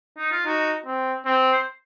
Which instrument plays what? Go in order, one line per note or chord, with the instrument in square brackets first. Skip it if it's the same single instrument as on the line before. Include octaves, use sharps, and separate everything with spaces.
[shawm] D#4
F4
[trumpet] D#4 [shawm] F#4
[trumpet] C4
C4
[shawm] C5